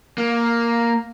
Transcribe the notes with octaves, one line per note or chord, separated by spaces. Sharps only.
A#3